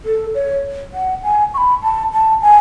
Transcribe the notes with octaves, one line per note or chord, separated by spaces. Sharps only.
A4
C#5
F#5
G#5
C#6
B5
A5
A5
G#5